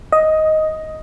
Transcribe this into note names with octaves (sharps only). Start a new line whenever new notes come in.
D#5